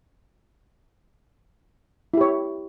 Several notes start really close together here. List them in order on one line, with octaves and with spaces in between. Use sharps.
E4 G4 C#5